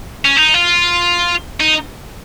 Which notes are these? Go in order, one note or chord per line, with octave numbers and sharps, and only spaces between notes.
C#4
D#4
F4
D#4